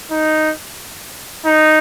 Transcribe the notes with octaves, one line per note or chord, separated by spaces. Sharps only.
D#4
D#4